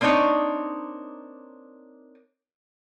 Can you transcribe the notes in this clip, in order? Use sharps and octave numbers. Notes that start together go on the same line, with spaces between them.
A#3 C4 D4 D#4 C#5